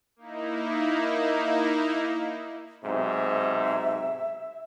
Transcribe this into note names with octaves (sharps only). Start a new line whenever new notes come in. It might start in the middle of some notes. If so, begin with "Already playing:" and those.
A#3 D#4 E4
B1 G#2 C3 E5